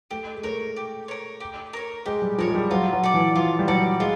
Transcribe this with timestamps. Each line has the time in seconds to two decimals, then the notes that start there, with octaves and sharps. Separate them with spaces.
0.11 A3 G4
0.35 G#3
0.43 A3 A#4 C#5
0.76 G4
1.08 A#4 C#5
1.40 G4
1.73 A#4 C#5
2.06 G#3 G4
2.22 G3
2.38 F3 A#4 C#5
2.50 G#3
2.55 G3
2.70 F#3 F4
2.93 F#3
3.04 A4 D5
3.14 E3
3.35 F3 F4
3.59 G3
3.67 F#3 A4 D5
4.00 G#3 F4